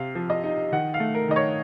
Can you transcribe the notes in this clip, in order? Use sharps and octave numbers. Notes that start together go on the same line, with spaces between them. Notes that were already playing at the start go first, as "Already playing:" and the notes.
Already playing: C3 F5
F3
D#5
D#4
D#3 F#5
F5
A3
A#4
D#3 D#5
C#5